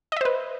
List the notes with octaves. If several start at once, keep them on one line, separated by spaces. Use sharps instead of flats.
B4 C5 D#5 E5